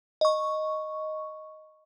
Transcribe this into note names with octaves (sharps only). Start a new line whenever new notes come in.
D#5 C#6